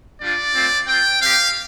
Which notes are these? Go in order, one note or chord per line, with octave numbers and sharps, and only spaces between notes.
G3 D4 F4 D5
A3 C4 F4
C4 F4 G5
C4 G4 F5